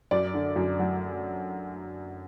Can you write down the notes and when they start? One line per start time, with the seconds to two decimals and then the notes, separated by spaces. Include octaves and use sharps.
0.11 F#2 D5
0.34 D3
0.56 F#2
0.79 F#3